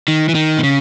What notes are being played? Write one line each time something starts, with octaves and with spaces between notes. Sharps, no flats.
D#3
E3
D#3
B2
C#3